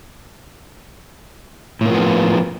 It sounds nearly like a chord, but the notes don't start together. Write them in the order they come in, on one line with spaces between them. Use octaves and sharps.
A2 A#3 F3 B3